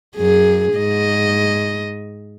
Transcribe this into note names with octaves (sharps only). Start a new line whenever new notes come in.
F#2 G#4
G#2 D#5